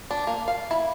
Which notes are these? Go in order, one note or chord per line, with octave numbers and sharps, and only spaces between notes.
D4
A#3
F5
E4